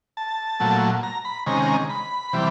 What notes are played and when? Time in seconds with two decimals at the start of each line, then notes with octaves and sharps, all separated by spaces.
0.17 A5
0.60 A#2 F#3 A3
1.03 A#5
1.25 B5
1.46 C3 D#3 G#3 C#4 A#5
1.89 B5
2.33 C3 E3 G3